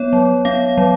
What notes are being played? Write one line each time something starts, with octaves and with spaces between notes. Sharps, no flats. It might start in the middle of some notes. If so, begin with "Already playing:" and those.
Already playing: B3 C#5
F#3
B3 F5
F#3